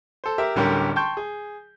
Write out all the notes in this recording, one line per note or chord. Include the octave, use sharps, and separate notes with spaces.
A4 C5
G4 A#4 E5
D1 D3 G3 C#4 G4 A#4
G5 A5 C6 C#6 G6
G#4